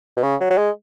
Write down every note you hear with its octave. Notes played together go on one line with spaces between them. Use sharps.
B2
C#3
F#3
F#3
G#3